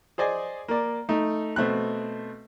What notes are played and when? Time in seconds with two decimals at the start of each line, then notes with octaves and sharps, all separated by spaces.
0.18 G#4 C5 D5 D#5 G#5
0.68 A#3 D5
1.09 A3 D#4
1.56 B2 A3 C4 F#6